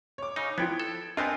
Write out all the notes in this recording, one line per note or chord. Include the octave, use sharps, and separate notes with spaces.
C#5 D6
C#3 D#4
F3 B3 E4 F4 G5 G#6
A4
B3 C4 D4 F4 A#4 D#5 G5 G#5